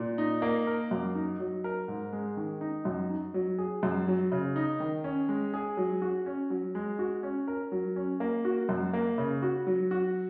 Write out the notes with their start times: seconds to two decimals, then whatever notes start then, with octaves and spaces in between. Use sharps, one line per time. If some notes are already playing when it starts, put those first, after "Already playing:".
Already playing: A#2
0.18 D#4
0.42 A#3
0.67 A#4
0.91 F#2
1.15 D#4
1.40 F#3
1.64 A#4
1.88 G#2
2.13 G#3
2.37 D#3
2.61 D#4
2.85 F#2
3.10 D#4
3.34 F#3
3.58 G#4
3.83 F#2
4.07 F#3
4.32 C#3
4.56 D#4
4.80 D#3
5.04 C#4
5.29 G#3
5.54 G#4
5.77 F#3
6.02 F#4
6.26 C#4
6.50 F#3
6.75 G#3
6.99 F#4
7.23 C#4
7.48 A#4
7.72 F#3
7.96 C#4
8.20 A#3
8.45 F#4
8.69 F#2
8.93 A#3
9.18 C#3
9.42 F#4
9.67 F#3
9.91 F#4